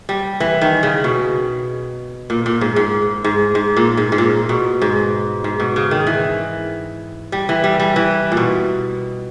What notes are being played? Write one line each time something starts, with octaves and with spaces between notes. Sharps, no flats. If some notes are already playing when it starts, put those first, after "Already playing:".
G3
E3
D#3
C#3
B2
A#2
A#2
G#2
G#2
G#2
G#2
A#2
G#2
G#2
A#2
B2
G#2
G#2
B2
C#3
D#3
E3
G3
E3
G3
G3
E3
A#2
B2